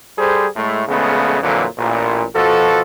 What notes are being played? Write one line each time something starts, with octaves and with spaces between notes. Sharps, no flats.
G3 G#4 A4 C5
A2 G#3 A3
A#1 C#3 G#3 A3 B3
F2 A#2 D3 E3 F#3
A1 A#2
B2 F3 F#4 A4